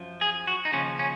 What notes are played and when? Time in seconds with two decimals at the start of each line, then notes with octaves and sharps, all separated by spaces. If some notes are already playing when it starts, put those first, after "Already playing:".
Already playing: F#2 F3
0.21 G#4
0.47 F#4
0.65 D#4
0.72 D#2 C#3 F3 C#4
0.99 C#4